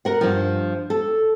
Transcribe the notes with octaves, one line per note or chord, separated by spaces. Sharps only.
A#4 F#5
G2 F3
A4